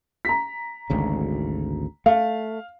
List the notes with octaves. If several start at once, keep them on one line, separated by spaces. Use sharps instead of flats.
A#5 B6
G#1 D2 C#3
A3 F5